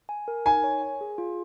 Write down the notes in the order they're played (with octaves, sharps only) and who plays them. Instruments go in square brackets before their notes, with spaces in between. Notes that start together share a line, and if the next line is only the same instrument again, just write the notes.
[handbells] G#5
A#4
[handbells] D#4 [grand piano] G#5
[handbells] C#5
G#5
G#4
F4